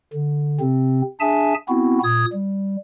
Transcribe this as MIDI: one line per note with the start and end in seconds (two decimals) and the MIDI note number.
0.13 0.59 50
0.60 1.02 48
0.60 1.02 60
1.20 1.54 62
1.20 1.54 68
1.20 1.54 76
1.20 1.54 80
1.20 1.54 81
1.69 1.99 59
1.69 1.99 60
1.69 1.99 64
1.69 1.99 66
2.03 2.25 46
2.03 2.25 87
2.03 2.25 92
2.32 2.76 55